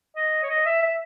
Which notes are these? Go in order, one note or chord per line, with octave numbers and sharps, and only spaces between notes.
D#5
C#5
D#5
E5
E5